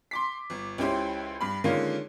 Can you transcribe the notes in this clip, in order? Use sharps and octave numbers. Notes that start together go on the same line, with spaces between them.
C6 D6 B6
G1
C#2 C#4 E4 G4 C5
G2 B5
D3 D#3 G#3 A#3 C#4 F4